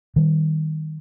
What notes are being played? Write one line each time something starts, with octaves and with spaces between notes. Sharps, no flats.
D#3 G3